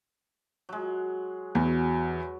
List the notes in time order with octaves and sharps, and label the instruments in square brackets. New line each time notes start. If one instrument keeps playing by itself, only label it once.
[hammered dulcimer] F#3 G#3
[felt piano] E2 [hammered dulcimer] F#3